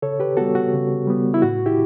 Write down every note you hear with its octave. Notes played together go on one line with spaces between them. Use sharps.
C#3 A4 C#5
G4 B4
G3 B3 F#4 A4
F#4
C#3
G3 B3
E4
A2 F#4
E4 G4